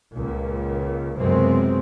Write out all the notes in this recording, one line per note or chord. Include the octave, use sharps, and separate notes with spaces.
C#2 A#2
C#2 F#2 C3 G#3 B3 C4